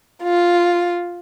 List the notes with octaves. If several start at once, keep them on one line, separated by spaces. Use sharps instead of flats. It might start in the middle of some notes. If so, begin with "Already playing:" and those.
F4